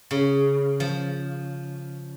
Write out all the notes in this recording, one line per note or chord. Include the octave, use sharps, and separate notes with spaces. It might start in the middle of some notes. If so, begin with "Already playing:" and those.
C#3
F3